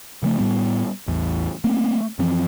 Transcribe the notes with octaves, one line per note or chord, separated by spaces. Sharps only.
C#3 F3 G3 A3
A2 G3 B3
A1 E2
A3 A#3 C4
F#2 E3 F3 C4